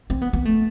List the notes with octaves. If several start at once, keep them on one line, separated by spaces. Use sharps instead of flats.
C4
B3
B3
A3